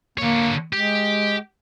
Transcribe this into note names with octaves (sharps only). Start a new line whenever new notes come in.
D3 A#3 C#5
G#3 G4